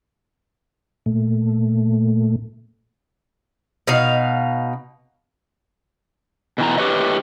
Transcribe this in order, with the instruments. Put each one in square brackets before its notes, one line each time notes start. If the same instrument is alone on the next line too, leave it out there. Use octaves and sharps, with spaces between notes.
[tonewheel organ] A#2 A3
[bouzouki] B2 D#4 F5
[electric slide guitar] B2 E3 A#5
G4 B4 C#5 D#5